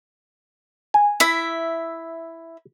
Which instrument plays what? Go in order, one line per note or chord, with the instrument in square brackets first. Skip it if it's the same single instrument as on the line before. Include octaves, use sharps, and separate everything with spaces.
[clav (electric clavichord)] G#5
[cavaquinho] E4 E5